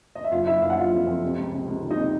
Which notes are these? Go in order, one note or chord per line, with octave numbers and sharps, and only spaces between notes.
D#5
E5
F#1 F4 F5
F#1 E4 E5
F#1 F5
F#5
F#1 F4 F5
F2
F2
C3
C#2
C3
C#2
D#3
D#4 D#5
C3